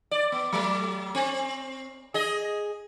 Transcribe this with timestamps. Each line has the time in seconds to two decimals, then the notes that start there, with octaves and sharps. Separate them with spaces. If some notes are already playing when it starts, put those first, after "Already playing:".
0.11 D5
0.32 B3
0.53 F#3 A3
1.15 C4
2.14 G#4 D#5